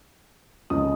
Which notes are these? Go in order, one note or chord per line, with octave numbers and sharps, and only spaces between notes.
C#2 C#3 F3 G#3 D#4 D#6